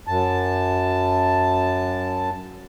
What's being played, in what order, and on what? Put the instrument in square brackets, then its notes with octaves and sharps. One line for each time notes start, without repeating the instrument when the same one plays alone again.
[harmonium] F#2 A5